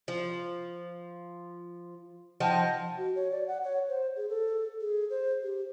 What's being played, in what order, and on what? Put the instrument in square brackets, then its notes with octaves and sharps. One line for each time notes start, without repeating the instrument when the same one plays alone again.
[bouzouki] F3
[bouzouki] F3 D#4 D#5 [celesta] F#5 G5 A5
[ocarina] F#4
C#5
D5
F#5
C#5
C5
G#4
A4
G#4
C5
G4